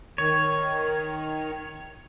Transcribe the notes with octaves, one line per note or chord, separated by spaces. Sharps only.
D#3 C#5